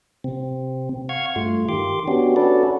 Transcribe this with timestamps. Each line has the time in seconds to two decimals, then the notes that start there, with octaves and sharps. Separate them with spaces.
0.24 C3 C4
1.09 F5 F#5 C#6 F6 G#6
1.36 G2 A3 F4
1.69 D#3 G4 C6 D6
2.08 B3 C#4 D4 F#4 G4
2.36 C#4 D4 F#4 A4 B4 D5